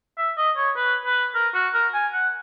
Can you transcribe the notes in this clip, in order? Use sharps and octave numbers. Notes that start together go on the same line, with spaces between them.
E5
D#5
C#5
B4
B4
A#4
F#4
A#4
G#5
F#5